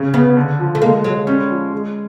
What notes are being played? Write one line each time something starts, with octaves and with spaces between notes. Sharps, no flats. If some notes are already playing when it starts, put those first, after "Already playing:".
Already playing: C#3 C#4
C#3 B3
D3
F3
A3
G#3 A#3
F#3 G#3
G3 C#4
F3
G#3